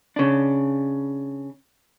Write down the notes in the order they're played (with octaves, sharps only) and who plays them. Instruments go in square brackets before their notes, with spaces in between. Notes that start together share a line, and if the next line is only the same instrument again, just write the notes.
[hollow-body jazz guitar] C#3 D4